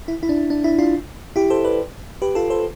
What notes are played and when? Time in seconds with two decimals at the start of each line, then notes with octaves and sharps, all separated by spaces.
0.08 E4
0.23 E4
0.29 D4
0.50 D4
0.64 E4
0.79 D4 F4
1.36 E4 G4
1.50 A4 C5
1.65 B4 D5
2.22 G4 B4
2.35 F4 A4
2.50 A4 C5